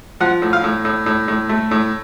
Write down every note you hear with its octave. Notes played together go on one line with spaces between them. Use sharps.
F3 F#5
A2
F5
A2
A2
A2
A2
A3
A2